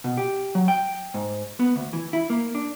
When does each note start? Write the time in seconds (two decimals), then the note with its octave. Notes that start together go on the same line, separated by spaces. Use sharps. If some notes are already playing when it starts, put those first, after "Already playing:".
0.04 B2
0.17 G4
0.55 F#3
0.68 G5
1.14 G#2
1.60 B3
1.76 D2
1.93 E3
2.13 E4
2.30 A#3
2.55 D4